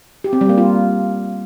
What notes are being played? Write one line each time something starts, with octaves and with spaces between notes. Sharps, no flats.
G4
C4
G3
A#3
F4